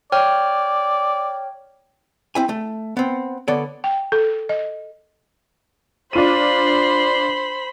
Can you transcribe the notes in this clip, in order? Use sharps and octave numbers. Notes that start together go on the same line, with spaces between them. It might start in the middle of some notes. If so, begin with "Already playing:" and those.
C#5 D5 G5 F6
C4 E4 G#5
A3
B3 C4
D3 B3 A4 C#5 D5
G5
A4
D#5
D4 F4 C5 B5 D#7